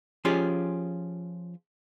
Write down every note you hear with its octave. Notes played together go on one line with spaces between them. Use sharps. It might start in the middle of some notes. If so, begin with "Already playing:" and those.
F3 C#4 F4 G4 G#4